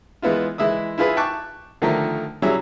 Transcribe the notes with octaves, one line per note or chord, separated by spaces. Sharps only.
E3 G#3 B3 E4 F4
E3 G#3 E4 E5 D#6
E4 F4 G#4 B4 E5
G5 A5 C#6 D6 F#6
D3 D#3 F3 A3 A#4
F#3 G3 C#4 E4 G#4 E5